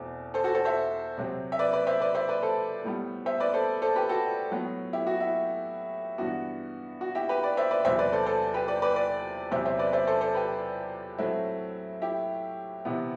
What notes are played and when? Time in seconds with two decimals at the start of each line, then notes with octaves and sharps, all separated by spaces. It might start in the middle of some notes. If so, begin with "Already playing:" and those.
Already playing: E2 B2 A3 C4
0.34 A4 C5
0.44 F#4 A4
0.55 A4 C5
0.65 C5 E5
1.18 C3 F#3 C4
1.52 E5
1.59 B4 D5
1.73 B4 D5
1.87 C5 E5
2.01 B4 D5
2.15 C5 E5
2.29 B4 D5
2.43 A4 C5
2.84 A2 G3 B3
3.26 C5 E5
3.40 B4 D5
3.54 A4 C5
3.82 A4 C5
3.96 G4 B4
4.09 F#4 A4
4.51 A2 F#3 B3
4.93 E4 G4
5.07 F#4
5.20 E4
6.18 G2 E3 B3 F#4
7.01 F#4
7.15 E4 G4
7.29 G4 B4
7.43 B4 D5
7.57 C5 E5
7.71 B4 D5
7.85 E2 C3 F#3 C5 E5
7.99 B4 D5
8.13 A4 C5
8.26 A4 C5
8.54 G4 B4
8.68 B4 D5
8.82 B4 D5
8.96 B4 D5
9.51 E2 C3 F#3 C4 C5 E5
9.65 C5 E5
9.79 B4 D5
9.93 C5 E5
10.07 A4 C5
10.21 A4 C5
10.35 G4 B4
11.18 A2 F#3 A3 C4 E4
12.02 E4 G4
12.85 C3 E3 B3